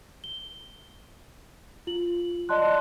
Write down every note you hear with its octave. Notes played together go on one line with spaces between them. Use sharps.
G7
F4 F#7
D5 D#5 A5 C6 F#6